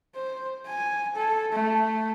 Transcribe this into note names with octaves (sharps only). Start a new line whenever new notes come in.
C5
G#5
A4
A3